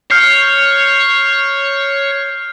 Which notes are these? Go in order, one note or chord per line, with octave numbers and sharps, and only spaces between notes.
C#5 F6 G6 C7